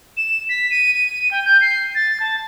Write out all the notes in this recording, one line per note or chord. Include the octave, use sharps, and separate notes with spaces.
E7
B6
D#7
D#7
G5
G6
C7
A6
A5